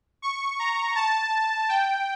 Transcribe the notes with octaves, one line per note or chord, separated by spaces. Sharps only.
C#6
A#5
A5
G5